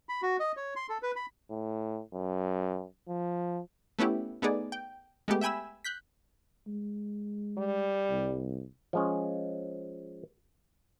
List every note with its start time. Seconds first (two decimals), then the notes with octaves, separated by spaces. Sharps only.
0.09 B5
0.23 F#4
0.40 D#5
0.57 C#5
0.76 C6
0.90 A4
1.03 B4
1.16 B5
1.50 A2
2.14 F#2
3.08 F3
3.99 A3 B3 C#4 E4 G4
4.42 A3 B3 D#4 G#4 D5
4.72 G5
5.28 G#3 A3 B3 G4
5.41 E5 G5 G#5 B5 E6
5.84 F#6 G6 B6
6.67 G#3
7.58 G3
8.10 C2
8.93 F3 G#3 C#4